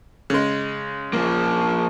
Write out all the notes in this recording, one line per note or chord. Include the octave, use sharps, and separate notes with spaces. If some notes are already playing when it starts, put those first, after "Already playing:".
C#3 G#3
F3 A#3